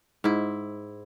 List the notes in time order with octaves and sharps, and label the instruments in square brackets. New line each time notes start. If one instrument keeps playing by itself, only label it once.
[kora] G#2 E4